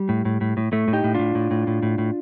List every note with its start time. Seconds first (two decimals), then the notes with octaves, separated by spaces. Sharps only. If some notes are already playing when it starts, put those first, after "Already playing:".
Already playing: G3
0.09 A2
0.25 A2
0.41 A2
0.57 A2
0.72 A2 A3
0.88 A2
0.93 D#4 G4
1.04 A2
1.14 A2 D4 F4
1.35 A2
1.51 A2
1.67 A2
1.83 A2
1.98 A2